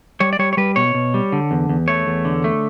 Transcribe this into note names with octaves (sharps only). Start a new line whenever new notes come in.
G3 C#5
D5
G3 C#5
C#5
G3 B4
B2 C#5
B2
G3
D3
E2
E2
A3 C#5
E2
D3
A3